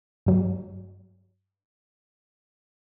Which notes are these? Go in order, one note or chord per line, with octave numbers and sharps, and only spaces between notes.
G2 F#3